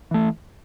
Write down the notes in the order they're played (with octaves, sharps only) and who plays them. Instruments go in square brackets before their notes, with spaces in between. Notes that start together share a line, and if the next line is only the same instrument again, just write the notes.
[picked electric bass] E3 A3